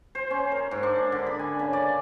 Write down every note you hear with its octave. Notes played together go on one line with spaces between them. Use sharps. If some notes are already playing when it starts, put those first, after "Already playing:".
C5
C#4
A#4
G#2
D4
D3
B5
G#5
C#3
D5